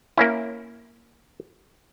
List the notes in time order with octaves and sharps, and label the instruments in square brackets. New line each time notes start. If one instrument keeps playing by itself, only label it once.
[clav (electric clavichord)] A#3 C#4 E4